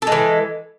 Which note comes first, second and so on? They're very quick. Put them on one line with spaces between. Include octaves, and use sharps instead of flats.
A4 G#3 E3